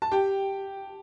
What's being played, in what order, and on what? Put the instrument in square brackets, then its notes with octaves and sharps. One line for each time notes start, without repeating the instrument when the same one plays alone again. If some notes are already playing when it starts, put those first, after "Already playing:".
[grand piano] A5
G4 G5